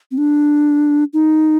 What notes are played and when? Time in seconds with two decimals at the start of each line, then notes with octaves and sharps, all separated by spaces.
0.11 C4
0.18 D4
1.13 D#4